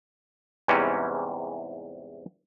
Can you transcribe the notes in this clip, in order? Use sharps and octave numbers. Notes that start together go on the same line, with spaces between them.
E2 G#2 C3 E3 G3 C#4